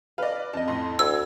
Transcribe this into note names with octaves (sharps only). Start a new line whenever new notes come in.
B4 D5 D#5 F5
F2 D#5 A5
F2 A2 C6
D2 E6 G#6